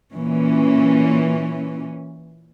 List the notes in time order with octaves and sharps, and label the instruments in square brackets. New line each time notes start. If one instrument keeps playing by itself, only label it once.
[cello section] A#2 E3 C#4